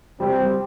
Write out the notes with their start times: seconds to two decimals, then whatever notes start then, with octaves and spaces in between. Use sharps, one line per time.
0.20 G3 C4
0.40 G3